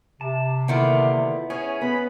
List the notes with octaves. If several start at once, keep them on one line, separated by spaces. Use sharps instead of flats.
C3 A5
D3 D#3 A#3 B3 E4 F4 F#5 B5
C#4 G#4 C#5
B3 B5